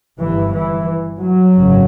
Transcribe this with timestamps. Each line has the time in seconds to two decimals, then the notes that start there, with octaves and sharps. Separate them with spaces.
0.18 G1 G2 E3
0.52 E3
1.20 F#3
1.53 G#1 F#2 C#3